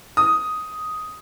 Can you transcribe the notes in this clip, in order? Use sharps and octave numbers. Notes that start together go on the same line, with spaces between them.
D#6